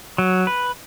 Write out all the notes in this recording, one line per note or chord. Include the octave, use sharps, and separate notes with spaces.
F#3
B4